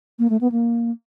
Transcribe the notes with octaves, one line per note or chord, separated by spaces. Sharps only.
A#3
A3
B3
A#3